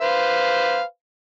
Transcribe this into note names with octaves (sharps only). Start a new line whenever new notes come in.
B4 C5 F5